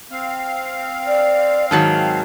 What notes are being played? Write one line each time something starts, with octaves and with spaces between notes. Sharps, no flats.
C4 F5
D5
G#2 D#3 F#3 A5